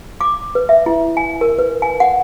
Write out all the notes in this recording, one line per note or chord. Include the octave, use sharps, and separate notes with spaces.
D6
B4
E5
E4
G#5
A#4
B4
G#5
F#5